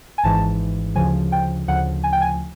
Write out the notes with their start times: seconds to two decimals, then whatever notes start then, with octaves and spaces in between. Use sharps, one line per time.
0.18 G#5
0.24 G#1 G#2 E3 A5
0.95 D2 C#3 F3 G#5
1.32 G5
1.68 D2 C#3 F3 F#5
2.04 G#5
2.13 G5
2.22 G#5